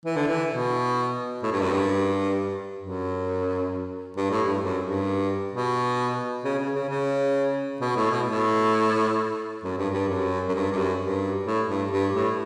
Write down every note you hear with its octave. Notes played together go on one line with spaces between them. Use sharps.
E3
D3
E3
B2
A2
G2
F#2
G2
F#2
G2
A2
G2
F#2
G2
B2
C#3
C#3
C#3
C#3
B2
A2
B2
A2
F#2
G2
G2
F#2
F#2
G2
G2
F#2
G2
A2
G2
G2
A2